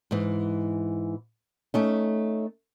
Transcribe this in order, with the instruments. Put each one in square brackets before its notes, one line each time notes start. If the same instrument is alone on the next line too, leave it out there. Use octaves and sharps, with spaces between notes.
[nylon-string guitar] G#2 E3
A3 C#4 D#4